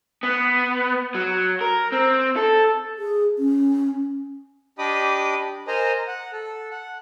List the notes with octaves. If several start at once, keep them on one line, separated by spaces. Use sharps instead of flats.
B3
F#3
A#4
C4
A4
G#4
C#4
D4 G4 D#5 B5 D6 D#6
A#4 C5 D#5 G#5 A#5
F#5
A4
F#5